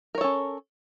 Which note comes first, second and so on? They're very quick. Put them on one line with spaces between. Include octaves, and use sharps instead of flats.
A#4 C#5 A4 C#4